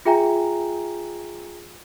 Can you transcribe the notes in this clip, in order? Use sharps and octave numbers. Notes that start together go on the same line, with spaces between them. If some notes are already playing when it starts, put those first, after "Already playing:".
F4 G#4 E5 G5 G#5 A#5